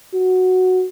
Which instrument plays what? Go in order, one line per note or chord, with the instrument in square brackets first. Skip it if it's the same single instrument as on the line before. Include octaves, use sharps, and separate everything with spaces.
[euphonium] F#4